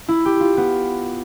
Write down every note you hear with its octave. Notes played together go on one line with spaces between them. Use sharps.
E4
G4
F4
B3